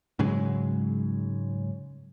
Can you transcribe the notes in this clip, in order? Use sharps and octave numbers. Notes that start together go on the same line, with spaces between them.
G#2 C#3 F#3 G#3